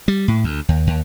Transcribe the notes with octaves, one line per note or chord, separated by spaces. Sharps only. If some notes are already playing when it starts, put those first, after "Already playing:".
G3
A2
D2
D#2
D#2